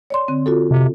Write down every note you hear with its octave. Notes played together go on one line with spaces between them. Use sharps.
C#5 D5 C6
D3 C4
F4 F#4 A4
C3